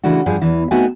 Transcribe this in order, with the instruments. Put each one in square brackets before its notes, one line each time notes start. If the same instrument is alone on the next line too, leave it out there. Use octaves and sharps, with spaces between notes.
[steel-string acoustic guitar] C#3 E3 A3 D4 F#4
G2 F3 G#4
E2 E3
A3 B3 C4 D#4 F#4 G#5